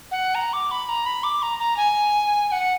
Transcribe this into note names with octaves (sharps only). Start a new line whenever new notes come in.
F#5
A#5
D6
B5
A#5
B5
D6
A#5
A#5
G#5
G#5
F#5